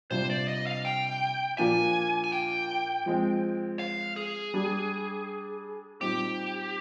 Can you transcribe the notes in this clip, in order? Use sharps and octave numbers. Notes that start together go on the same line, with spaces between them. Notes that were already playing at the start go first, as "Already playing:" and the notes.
C3 G3 D4 F4 C5
D5
D#5
F5
G5
A#2 F3 A#3 D4 F4 G#5
G#5
G5
F3 G#3 C4
F5
G#4
G3 D4 G4
A#2 G3 C4 D#4 G4